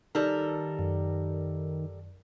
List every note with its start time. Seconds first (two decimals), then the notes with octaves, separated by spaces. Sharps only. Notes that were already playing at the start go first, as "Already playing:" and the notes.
0.15 D#3 G3 A4 A#4
0.79 F#2